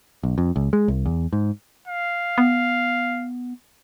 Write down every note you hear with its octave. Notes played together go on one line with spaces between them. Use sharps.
B1
F2
C#2
G#3
C2
E2
G#2
F5
B3